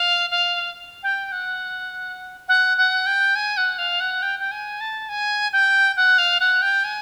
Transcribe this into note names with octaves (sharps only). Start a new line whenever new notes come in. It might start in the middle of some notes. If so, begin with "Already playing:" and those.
Already playing: F5
F5
G5
F#5
F#5
F#5
G5
G#5
F#5
F5
F#5
G5
G5
G#5
A5
G#5
G5
F#5
F5
F#5
G5
G#5